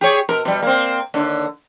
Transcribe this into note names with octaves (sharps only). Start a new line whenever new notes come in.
G4 G#4 C#5
B2 A#4
B2 G3
A#3 C4
D#2 D3